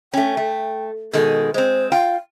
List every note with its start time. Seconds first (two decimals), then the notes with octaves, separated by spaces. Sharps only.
0.14 A3 C#4 G5
0.37 A3
1.13 B2 D#3 G#3 A4
1.54 G#3 C4 C5
1.92 F4 F5 G5